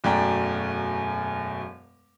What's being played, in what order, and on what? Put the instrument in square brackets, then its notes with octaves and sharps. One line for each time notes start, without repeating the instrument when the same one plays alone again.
[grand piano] E1 F#2 A3 D5 G5 A#5